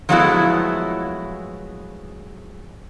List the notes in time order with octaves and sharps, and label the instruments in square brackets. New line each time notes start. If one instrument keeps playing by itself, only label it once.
[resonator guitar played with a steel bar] F3 F#3 G#3 A3 B3 E4